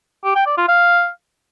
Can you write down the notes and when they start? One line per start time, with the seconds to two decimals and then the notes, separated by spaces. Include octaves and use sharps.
0.25 G4
0.36 G5
0.47 D5
0.58 F4
0.69 F5